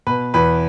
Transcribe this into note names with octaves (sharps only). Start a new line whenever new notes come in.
B2 B4
E2 B4